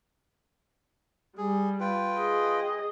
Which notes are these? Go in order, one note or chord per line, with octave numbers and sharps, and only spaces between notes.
G3 G#4
F4 B4 G5
G#4 D#5